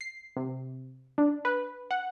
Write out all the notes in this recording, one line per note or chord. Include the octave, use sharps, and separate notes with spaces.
C7
C3
D4
B4
F#5